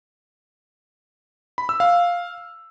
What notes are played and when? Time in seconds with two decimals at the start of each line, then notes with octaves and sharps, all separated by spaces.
1.58 B5
1.69 E6
1.80 F5